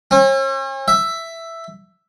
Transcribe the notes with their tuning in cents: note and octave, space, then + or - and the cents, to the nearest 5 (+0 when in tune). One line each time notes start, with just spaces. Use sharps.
C#4 -45
E5 +5